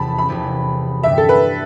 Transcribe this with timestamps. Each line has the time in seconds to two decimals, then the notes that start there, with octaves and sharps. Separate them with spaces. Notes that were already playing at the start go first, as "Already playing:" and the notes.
Already playing: F1 E2 C3 A5 B5
0.18 B5
0.29 F1 E2 C3
1.03 G2 D3 G3 E5
1.18 A4
1.29 B4